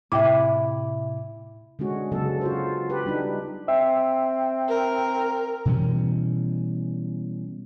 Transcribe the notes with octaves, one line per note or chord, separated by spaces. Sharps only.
A2 C3 E4 E5 G5 D6
D3 G#3 C#4 F#4
C#3 F#3 B3 A4
F4 F#4 C5
G4 B4
G3 D4 D#4
C4 E5
A#4
B2 E3 G3 C#4